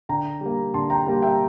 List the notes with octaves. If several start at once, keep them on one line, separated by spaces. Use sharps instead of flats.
D3 G5 A#5
G3 A#3
D3 A5 C6
G5 A#5
G3 A#3
E5 G5